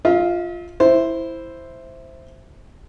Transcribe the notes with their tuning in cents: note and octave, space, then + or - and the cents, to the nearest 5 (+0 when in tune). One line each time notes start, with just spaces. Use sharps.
F4 +0 E5 -45
E4 +0 C5 +0